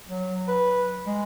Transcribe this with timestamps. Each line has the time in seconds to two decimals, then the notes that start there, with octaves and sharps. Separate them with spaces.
0.08 F#3
0.48 B4
1.07 G#3